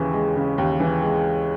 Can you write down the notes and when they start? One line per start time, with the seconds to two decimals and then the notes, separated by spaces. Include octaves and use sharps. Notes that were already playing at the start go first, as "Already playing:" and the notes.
Already playing: D#2 C#3 E3
0.13 G#3
0.36 C#3
0.58 D#2
0.80 E3
1.02 G#3